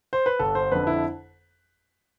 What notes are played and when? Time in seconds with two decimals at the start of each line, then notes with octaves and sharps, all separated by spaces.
0.13 C5
0.26 B4
0.39 G1 A4
0.55 C5
0.71 F2 D3 B4
0.87 E4